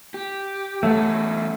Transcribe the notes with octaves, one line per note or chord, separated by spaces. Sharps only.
G4
E2 A3 C#4 F#5